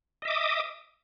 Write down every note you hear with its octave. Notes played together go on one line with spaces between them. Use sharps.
D#5 E5 D6 D#6